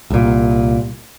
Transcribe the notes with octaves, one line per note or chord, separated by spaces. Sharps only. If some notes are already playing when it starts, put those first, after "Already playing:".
C2 A#2